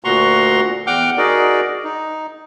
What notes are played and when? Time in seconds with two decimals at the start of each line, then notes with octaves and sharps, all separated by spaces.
0.05 D2 A#2 F#4 A#5 C6 C#6
0.87 E2 F#5 G5 D6 F6 G6
1.18 D#4 F#4 G#4 A#4 D5
1.84 D#4